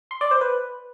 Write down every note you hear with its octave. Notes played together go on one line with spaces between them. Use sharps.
C6
D5
C5
B4